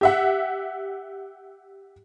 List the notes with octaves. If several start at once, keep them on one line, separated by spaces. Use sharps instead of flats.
G4 E5 F#5